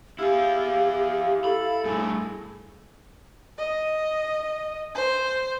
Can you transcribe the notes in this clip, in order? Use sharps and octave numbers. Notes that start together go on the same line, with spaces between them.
E4 G4 G#4 F5
E4 A4 B5
G2 A3 G#4
D#5
C5